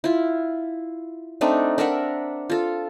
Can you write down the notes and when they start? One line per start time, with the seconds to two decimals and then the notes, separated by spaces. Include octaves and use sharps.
0.04 E4 F4
1.41 A3 C4 D4 D#4
1.78 D4 A#4 E5 F#5
2.50 F4 A4